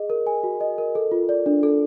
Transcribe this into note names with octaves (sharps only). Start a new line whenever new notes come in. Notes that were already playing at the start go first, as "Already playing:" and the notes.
Already playing: G#4 D#5
A#4
G#5
F#4
D#5
A#4
A4
F4
D5
D4
A4